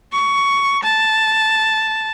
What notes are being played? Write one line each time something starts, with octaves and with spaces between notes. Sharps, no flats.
C#6
A5